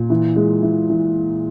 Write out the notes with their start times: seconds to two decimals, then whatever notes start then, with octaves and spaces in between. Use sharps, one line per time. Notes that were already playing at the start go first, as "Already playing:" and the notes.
Already playing: A#2
0.10 E3
0.36 G#3
0.63 E3
0.90 E3